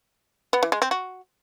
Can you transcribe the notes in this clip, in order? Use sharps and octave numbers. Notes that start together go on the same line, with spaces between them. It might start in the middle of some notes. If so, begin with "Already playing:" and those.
B3
E3
G#3
C4
F#4